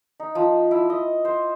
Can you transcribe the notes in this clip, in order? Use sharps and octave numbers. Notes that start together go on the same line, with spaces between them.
D#4
F3
E4
D#5
C5